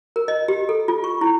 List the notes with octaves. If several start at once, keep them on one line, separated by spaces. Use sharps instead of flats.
A#4
D#5
G4
A4
F4
C#6
E4